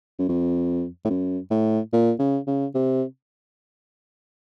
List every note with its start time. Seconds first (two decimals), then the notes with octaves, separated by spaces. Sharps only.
0.19 F#2
0.29 F2
1.05 A2
1.10 F#2
1.51 A2
1.93 A#2
2.19 C#3
2.47 C#3
2.75 C3